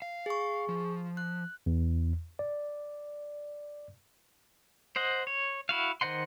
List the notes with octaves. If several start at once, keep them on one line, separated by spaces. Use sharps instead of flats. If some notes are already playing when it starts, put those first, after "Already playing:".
F5
G#4 C#6
F3
F#6
E2
D5
C5 D#5 F#5
C#5
E4 F#4 F5
D#3 C5 D#5 F#5 C6